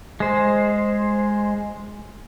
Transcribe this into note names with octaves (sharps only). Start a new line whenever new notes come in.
G#3 C5